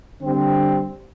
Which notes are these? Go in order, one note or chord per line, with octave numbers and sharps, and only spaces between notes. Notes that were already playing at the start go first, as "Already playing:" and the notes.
D3 G3 C4